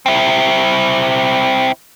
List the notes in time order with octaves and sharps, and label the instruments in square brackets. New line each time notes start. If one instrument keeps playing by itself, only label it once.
[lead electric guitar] C4 E4